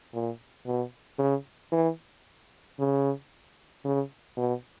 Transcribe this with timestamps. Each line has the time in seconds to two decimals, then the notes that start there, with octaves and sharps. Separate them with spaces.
0.13 A#2
0.66 B2
1.19 C#3
1.72 E3
2.79 C#3
3.85 C#3
4.37 B2